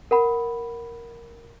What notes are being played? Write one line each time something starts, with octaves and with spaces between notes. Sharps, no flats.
A#4 F#5 B5